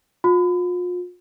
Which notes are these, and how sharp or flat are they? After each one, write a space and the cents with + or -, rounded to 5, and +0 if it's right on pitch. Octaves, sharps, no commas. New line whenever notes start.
F4 +40